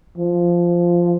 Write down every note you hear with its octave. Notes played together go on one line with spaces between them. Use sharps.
F3